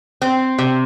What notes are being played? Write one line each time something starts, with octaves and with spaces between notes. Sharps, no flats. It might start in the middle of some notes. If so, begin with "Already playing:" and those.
C4
C3